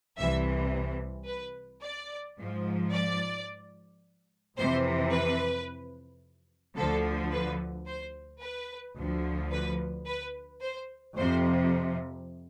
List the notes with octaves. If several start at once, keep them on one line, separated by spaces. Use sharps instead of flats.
C2 C3 E3 E5
B4
D5
G#2 F3
D5
F2 C3 E3 C5
B4
D2 D3 F3 A4
B4
C5
B4
D2 D3 F3
B4
B4
C5
F2 C3 F3 C5